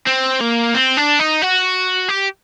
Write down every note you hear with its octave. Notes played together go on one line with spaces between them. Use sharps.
C4
A#3
C4
D4
D#4
F#4
G4